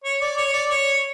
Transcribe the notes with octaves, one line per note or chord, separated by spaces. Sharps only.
C#5
D5
C#5
D5
C#5